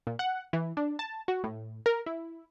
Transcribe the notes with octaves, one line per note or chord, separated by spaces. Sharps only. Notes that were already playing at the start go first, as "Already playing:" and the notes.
A#2
F#5
E3
D4
A5
F#4
A2
A#4
E4